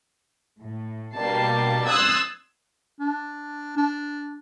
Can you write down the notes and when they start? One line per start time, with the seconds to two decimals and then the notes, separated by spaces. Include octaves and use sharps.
0.62 A2
1.16 B2 G3 A#3 D4 A5 C7
1.88 C6 D#6 E6 F#6 G#6 A6
3.00 D4
3.77 D4